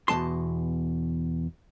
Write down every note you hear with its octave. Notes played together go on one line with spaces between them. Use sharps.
E2 B2 G#3 A5 C6